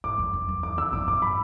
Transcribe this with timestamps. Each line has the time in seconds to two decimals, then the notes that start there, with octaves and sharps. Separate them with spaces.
0.04 G#2 D6
0.19 F#2
0.33 F#2
0.49 E2
0.63 D6
0.78 E6
0.93 F#2 D6
1.08 G#2 D6
1.22 B5